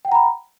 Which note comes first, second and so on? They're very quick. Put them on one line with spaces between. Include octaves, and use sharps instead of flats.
G5 F#5 A#5 B5